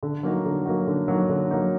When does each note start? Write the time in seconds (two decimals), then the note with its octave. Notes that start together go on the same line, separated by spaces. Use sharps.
0.03 D3
0.23 F#3 A#3 D#4 F#4
0.45 D3
0.66 F#3 A#3 D#4 F#4
0.87 D3
1.08 F#3 A#3 D#4 F#4
1.29 D3
1.50 F#3 A#3 D#4 F#4